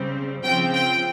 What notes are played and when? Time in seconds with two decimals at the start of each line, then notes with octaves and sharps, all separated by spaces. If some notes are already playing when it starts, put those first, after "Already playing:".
Already playing: C#3 G3 C4
0.43 C#3 F3 C4 F4 G5
0.73 G5